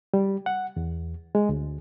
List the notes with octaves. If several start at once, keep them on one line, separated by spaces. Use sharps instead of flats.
G3
F#5
E2
G#3
D2